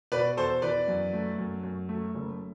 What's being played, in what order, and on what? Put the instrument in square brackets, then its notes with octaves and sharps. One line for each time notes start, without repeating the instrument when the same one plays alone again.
[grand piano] B2 B4 D5
E2 A4 C5
E3 B4 D5
F#2
A3
F#2
F#2
A3
F#1